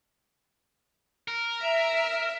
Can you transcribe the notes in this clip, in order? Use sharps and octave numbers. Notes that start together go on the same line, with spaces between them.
A#4
E5